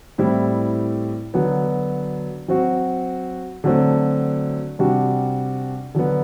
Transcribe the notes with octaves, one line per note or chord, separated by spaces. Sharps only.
A2 G3 C4 E4
D3 F#3 B3
F#3 C4 F#4
D3 F#3 A3 C4
C3 G3 D4 F#4
D3 F#3 B3